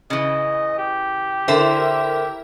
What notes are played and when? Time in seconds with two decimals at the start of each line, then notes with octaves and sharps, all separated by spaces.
0.10 C#3 E3 D#5
0.78 G4
1.48 D3 E4 A#4 C5 E5
1.80 G4